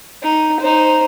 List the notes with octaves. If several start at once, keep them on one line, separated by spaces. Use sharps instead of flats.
D#4
D#4 C5